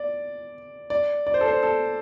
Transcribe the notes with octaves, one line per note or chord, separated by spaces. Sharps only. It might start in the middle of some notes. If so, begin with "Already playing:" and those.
Already playing: D5
D5
D5
C5
A4
C5
A4